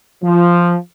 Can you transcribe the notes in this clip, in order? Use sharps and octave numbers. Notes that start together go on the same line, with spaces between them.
F3